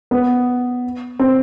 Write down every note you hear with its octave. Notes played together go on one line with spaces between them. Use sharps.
B3
C4